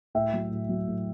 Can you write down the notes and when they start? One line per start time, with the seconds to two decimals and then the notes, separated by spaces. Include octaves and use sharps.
0.15 A2 E5 G5
0.33 F#3
0.51 A2
0.69 F#3
0.88 A2